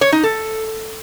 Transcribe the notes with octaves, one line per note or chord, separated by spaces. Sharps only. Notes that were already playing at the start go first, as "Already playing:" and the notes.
C#5
D#4
A4